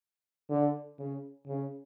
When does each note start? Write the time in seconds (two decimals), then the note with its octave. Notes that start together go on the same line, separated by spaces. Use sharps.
0.50 D3
0.99 C#3
1.47 C#3